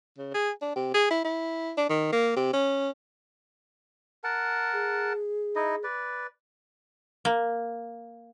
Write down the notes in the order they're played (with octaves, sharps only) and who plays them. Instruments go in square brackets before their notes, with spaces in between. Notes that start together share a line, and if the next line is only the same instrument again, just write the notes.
[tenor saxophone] C#3
G#4
D4
C3
G#4
E4
E4
D4
D#3
A#3
C3
C#4
[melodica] A#4 F#5 A5
[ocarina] G#4
[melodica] D#4 E4 D#5
B4 D5
[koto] A#3